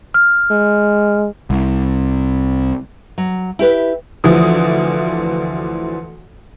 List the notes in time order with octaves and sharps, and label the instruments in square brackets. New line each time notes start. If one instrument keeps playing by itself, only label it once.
[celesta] F6
[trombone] G#3
[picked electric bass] C2
[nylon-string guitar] F#3
E4 G4 B4
[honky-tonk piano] D2 E3 F3 D#6